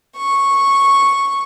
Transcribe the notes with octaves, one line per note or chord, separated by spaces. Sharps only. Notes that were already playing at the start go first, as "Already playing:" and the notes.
C#6